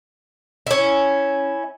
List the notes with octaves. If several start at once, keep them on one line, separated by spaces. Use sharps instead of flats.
C#4 E4